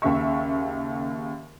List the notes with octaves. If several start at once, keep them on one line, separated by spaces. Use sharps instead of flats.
D#2 C#3 E5 C#6